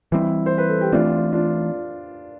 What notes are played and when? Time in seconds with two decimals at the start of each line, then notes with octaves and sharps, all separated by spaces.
0.12 E3 G3 C4 E4
0.46 C5
0.58 B4
0.69 A4
0.81 G4
0.92 E3 A3 C4 D4 F4
1.32 D4 F4